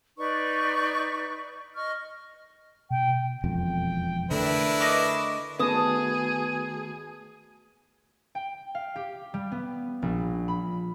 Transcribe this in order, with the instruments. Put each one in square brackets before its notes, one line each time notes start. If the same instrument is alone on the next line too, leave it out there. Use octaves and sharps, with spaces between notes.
[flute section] D#4 B4 D5 C#6
D#5 C#6 F6
[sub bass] B2 [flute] G5
[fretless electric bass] E1 F2 [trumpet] G5
[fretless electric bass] D3 A3 [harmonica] D4 E4 A#4 [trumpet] B4
[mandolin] D#5 C#6 D6
[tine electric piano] D#3 A3 F#4 [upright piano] B3 [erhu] G#4 [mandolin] A5 D#6
[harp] G5
F5
G4
G3
B3
A#1
B5